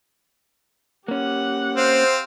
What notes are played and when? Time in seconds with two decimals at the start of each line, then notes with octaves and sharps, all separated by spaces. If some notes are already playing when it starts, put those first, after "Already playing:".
1.08 A#3 C#4 G4 F#5
1.76 C4 C5 F5